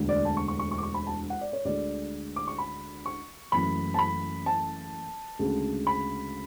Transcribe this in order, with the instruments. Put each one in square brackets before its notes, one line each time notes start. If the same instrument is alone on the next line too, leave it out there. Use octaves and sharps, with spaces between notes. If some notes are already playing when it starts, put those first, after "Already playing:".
Already playing: [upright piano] E1 D2 D3 A3
D5
A5
C#6
C#6
C#6
C#6
D6
C#6
B5
A5
F#5
D5
C#5
D2 D3 G#3 D5
D6
C#6
B5
C#6
F#1 F#2 E3 A3 B5
A5
B5
A5
D2 C#3 G#3
B5